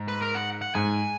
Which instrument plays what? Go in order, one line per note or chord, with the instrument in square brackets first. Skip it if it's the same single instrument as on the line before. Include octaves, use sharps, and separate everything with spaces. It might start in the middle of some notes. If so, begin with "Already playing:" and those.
Already playing: [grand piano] G#2
[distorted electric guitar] B4
A#4
F#5
F#5
[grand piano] G#2 [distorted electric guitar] G#5